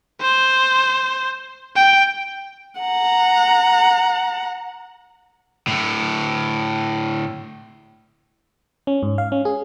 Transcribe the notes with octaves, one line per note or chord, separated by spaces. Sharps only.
C5
G5
F#5 A#5
A2 D3
C#4
G#2
F5
C#4
G#4